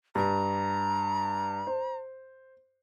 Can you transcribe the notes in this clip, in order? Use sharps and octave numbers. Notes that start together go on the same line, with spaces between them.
G2 A#5
C5